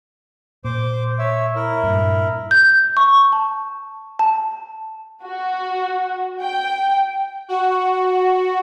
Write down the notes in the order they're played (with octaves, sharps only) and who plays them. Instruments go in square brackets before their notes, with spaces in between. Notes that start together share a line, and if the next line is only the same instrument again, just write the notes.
[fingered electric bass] A#2 [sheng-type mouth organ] C5 D6
[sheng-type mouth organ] C#5 E5
E4 A#4
[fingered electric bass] G2 A#2
[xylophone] G6
C#6
A5
A5
[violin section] F#4
G5
[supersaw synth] F#4